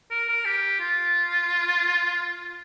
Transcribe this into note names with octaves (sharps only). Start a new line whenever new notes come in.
A#4
A#4
G4
F4